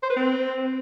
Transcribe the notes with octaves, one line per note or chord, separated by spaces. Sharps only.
C5
B4
C4